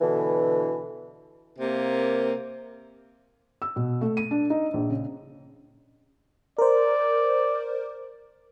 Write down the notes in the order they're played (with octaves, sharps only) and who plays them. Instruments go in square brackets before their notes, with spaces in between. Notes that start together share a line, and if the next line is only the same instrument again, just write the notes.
[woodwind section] B2 D3 E3
[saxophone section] C3 A#3
[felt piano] E6
B2
A3
D#7
D4
D#4
A#1
C#3
[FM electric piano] A#4 C5 [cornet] D5